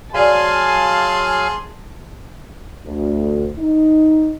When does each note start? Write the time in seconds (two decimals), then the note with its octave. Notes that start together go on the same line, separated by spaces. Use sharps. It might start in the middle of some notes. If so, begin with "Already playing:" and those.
0.14 F#3 G#4 D5 E5 F5 G#5 A5 C6
2.86 D2
3.58 D#4